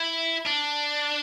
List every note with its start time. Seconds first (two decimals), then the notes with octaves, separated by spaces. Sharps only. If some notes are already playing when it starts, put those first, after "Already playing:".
Already playing: E4
0.46 D4